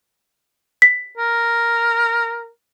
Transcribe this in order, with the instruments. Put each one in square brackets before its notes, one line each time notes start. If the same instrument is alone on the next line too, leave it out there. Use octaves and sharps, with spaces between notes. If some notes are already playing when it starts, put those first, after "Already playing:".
[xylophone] B6
[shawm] A#4